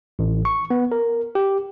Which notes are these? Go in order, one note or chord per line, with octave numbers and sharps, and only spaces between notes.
A1
C#6
B3
A#4
G4